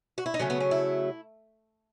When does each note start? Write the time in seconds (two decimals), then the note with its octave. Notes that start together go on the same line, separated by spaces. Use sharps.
0.18 F#4
0.26 E4
0.34 D#4
0.40 C#3 F#3 A3 C#4
0.50 B3
0.60 C#4
0.71 E4